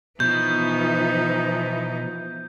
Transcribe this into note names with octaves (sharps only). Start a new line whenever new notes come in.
B2 E3 F3 D#4 G6